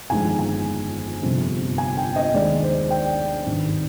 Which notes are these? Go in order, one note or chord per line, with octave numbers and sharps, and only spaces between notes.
G1 F2 D#3 G#3 G#5
G#5
G1 F2 C3 G3
G#5
G5
D#5
D#2 D#3 G#3 D5
C5
G5
G#1 G2 D#3